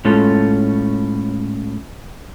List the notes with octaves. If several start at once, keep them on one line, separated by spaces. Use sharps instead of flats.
A2 G#3 C#4 F4 A4